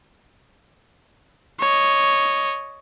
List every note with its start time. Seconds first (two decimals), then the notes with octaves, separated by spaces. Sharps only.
1.60 C#5 D#5